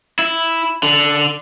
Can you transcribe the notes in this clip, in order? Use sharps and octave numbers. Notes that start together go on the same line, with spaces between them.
E4
D3